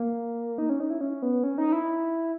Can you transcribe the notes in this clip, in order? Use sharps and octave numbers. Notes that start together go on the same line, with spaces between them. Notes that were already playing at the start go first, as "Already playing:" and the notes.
Already playing: A#3
D#4
C#4
D#4
E4
C#4
B3
C#4
D#4
E4